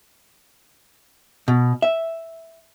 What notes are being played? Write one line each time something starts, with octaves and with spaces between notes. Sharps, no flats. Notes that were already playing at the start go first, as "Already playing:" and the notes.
B2
E5